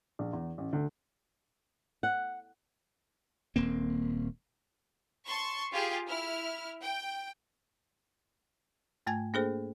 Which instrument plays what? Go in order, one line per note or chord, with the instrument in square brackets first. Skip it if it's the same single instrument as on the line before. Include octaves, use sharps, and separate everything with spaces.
[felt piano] A#1
E2
A1
D2
[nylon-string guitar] F#5
[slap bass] D#1 A#3 C4
[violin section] A5 C6 C#6
F4 G4 G#4 F5
E4 F6
G5
[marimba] G#2 A3 G#5 G#6
A#3 D4 G#4 A4 C5